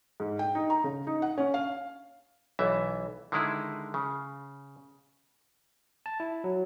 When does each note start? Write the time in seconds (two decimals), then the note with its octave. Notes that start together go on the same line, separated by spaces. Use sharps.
0.20 G#2
0.39 G5
0.55 D#4
0.70 A#5
0.84 C#3
1.07 D#4
1.22 F#5
1.38 C#4
1.54 F5
2.59 B1 E3 E5
3.32 D3 D#3 G#3 E4 G#4
3.94 C#3
6.06 A5
6.20 E4
6.44 F#3